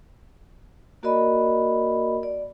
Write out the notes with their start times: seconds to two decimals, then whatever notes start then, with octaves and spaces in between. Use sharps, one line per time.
1.03 A#3 F#4 A#4 D5 D#5 B5
2.23 D5